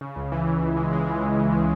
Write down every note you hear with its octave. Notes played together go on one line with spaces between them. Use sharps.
C#3
C#2
E3
C#3
C#2
G#3
G#3
C#3
C#2
C#3
G#3